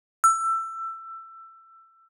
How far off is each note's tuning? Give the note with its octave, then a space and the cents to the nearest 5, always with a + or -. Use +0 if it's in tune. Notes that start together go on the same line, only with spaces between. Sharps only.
E6 +20